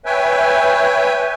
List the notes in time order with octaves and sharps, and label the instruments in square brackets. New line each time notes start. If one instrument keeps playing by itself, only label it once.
[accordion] B4 C#5 E5 G5 G#5